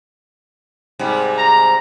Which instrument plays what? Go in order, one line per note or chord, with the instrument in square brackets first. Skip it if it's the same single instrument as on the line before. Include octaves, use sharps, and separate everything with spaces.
[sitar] G#2 C3 G3
[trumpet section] A#5